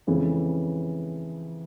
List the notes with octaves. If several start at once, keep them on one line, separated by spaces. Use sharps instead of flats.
F2 C#3 E3 G#3